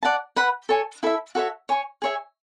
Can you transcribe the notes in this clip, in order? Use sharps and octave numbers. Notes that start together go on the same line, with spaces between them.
D5 F#5 A5
B4 F#5 B5
A4 C#5 G#5
E4 A4 E5
F#4 A4 C#5 E5
C#5 G#5 C#6
G#4 C#5 E5 G#5